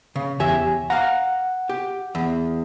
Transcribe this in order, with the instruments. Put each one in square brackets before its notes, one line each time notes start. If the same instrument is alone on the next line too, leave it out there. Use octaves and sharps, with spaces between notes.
[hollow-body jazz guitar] C#3
[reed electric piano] E2 G4 G#5 [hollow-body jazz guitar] C#5 E5
[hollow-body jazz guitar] F5 A#5 [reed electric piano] F#5
[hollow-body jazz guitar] G4
E2